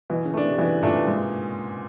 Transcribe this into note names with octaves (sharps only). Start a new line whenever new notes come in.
B2 E3
C#3
A3 D4
C3
B2 E3
A#2 A3 D4
G#2